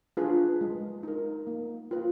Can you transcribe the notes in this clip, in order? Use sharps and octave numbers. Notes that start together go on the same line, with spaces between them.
D4 F4 G#4 B4
G#3
D#4 A#4
A#3
F4 B4